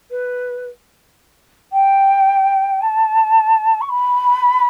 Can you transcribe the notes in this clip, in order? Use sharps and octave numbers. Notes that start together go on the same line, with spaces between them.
B4
G5
A5
C#6
B5